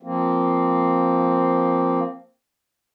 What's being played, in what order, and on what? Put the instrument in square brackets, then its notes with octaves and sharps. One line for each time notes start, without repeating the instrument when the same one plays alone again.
[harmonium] F3 A#3 C4